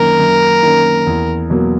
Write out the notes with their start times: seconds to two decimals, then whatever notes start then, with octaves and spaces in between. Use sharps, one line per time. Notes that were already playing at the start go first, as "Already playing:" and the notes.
Already playing: F#2 D#3 A#3 C#4 A#4
0.19 F#2
0.62 D#3 A#3 C#4
1.07 E2
1.50 B2 F#3 A#3